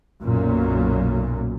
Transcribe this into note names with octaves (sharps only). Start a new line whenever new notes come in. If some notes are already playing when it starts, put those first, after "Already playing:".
B1 F#2 A#2